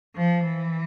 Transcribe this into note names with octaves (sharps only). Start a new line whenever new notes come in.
F3
E3